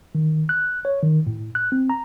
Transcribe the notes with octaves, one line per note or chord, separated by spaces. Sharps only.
D#3
F#6
C#5
D#3
A2
F#6
C4
A#5